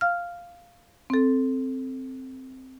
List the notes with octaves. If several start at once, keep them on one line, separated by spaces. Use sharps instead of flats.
F5 F6
C4 A4